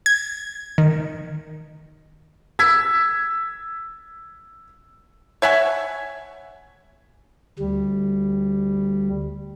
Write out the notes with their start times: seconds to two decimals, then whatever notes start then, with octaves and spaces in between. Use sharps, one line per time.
0.06 G#6
0.78 D#3
2.59 E6 G#6 B6
5.42 C#5 E5 F#5 G#5
7.59 D2 G3